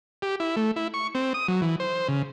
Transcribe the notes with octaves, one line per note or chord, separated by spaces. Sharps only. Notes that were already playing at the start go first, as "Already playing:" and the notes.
G4
E4
A3
E4
C#6
C4
D#6
F#3
E3
C5
C#3